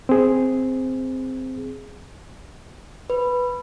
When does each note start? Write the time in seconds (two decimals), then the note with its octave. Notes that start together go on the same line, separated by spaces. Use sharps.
0.09 C4 G#4
3.10 B4